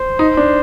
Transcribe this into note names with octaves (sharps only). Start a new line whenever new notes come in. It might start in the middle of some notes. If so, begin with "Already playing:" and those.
Already playing: C5
D#4
D4